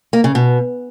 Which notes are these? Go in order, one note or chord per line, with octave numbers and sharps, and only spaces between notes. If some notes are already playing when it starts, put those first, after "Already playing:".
A#3
C#3
B2